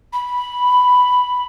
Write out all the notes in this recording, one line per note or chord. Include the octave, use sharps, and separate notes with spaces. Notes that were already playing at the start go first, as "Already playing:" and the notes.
B5